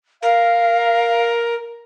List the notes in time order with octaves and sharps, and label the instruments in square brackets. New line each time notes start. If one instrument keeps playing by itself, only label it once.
[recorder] A#4 [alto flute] F5